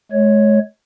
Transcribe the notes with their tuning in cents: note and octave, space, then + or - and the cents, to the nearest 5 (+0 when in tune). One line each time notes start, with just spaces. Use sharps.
G#3 +35 C#5 +0